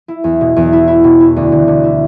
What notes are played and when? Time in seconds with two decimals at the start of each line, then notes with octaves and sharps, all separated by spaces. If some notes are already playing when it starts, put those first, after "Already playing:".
0.08 E4
0.24 E2
0.41 B2
0.56 E2
0.73 E4
0.87 E4
1.04 B2
1.20 E4
1.36 D2
1.52 D3
1.67 D3
1.84 E4